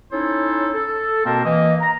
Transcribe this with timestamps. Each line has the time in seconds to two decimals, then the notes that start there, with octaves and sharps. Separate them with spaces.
0.12 C#4 D#4 E4 A4 C5 C#5
0.74 A4
1.25 B2 A#3 C4 A#4 C5 A5
1.45 E3 A#3 D#5
1.81 A#5